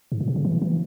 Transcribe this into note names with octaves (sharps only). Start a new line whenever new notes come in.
G#2
A#2
C3
C#3
E3
E3